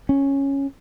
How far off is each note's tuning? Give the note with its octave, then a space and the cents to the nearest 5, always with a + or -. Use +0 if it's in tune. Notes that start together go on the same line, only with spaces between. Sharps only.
C#4 -5